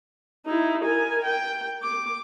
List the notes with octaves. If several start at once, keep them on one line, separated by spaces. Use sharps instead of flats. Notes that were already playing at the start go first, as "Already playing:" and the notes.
D#4 E4
A#4 G#5
G5
D6